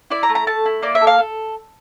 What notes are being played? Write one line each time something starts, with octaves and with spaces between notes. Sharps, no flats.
E4 D5
A#5
A3
A#5
A3 A5
E4
A#3 D5
E5
A4
F5
A4